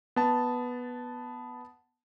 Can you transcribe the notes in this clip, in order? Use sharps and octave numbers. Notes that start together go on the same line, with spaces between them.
B3 A5